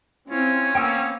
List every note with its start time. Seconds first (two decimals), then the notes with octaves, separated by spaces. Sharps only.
0.29 C4 C#4 E4 F4
0.75 A#3 B3 G5 D#6 E6